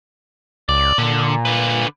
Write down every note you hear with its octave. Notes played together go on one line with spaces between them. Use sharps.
C#2 D5
A#2 D3
D3 B4